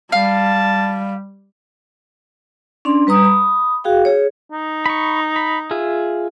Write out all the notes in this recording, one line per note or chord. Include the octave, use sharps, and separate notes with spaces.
G3 F5 A5
C#4 D4 D5 C6
G3 B4 A#5 D#6
B5 D#6
F#4 G#4 F5 G5
G#4 C#5
D#4
B5 C#6
B5
F4 G#4 E5